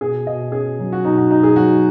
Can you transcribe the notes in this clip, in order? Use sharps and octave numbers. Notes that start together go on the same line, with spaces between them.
B2 G#4
B2 D#5
C#4 G#4
F#3
F#4
B2 D#4
F#4
B2 D#4
G#4
F#3 F#4